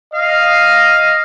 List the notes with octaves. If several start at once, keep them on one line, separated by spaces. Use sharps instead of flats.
D#5 F5